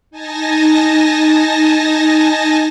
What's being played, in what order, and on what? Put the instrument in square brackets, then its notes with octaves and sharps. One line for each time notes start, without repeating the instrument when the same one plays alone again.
[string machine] D#4 G#5 A5 A#6